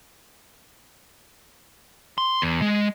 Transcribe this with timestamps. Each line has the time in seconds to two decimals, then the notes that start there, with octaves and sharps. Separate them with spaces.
2.18 C6
2.42 E2
2.62 G#3